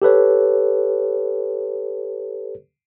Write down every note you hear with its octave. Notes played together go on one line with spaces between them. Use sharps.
G4 A4 B4 C#5